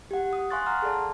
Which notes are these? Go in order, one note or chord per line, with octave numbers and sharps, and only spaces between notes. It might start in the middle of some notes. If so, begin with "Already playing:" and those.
G4 F#5
D#6
F5 G#5 C6 C#6 F#6 A6
F#5 A#5 C6 F6
G#4 A4 D5 A5